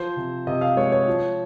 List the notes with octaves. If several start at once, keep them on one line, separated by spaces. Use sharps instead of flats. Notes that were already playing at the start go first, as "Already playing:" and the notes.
Already playing: F3 C5
C3
C3 D#5
F5
G#3 C#5
C#5
F3